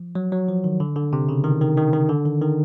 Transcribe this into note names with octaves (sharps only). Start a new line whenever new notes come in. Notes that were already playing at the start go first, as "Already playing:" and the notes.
Already playing: F3
F#3
F#3
F3
D#3
D3
D3
C3
C#3
D#3
D#3
D#3
D#3
D3
D#3
D#3